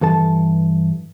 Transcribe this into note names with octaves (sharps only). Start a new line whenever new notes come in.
G2 E3 A4 A5